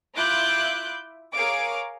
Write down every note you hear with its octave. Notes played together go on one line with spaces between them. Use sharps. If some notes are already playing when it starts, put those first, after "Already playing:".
E4 F4 E5 D6 F#6 G6
G#4 A#4 C#5 F5 D6 D7